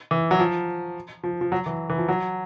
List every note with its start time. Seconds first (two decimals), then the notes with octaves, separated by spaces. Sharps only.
0.11 E3
0.31 F#3
0.39 F3
1.23 F3
1.41 F3
1.52 F#3
1.66 E3
1.90 E3
1.98 F3
2.08 F#3